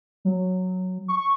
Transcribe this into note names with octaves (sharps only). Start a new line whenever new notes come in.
F#3
C#6